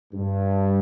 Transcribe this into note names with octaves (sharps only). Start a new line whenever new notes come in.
G2